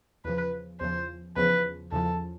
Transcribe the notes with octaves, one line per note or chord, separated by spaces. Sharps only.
E2 C#3 F3 B4
E2 C#3 F3 C5
E2 C#3 F3 B4
E2 C#3 F3 A4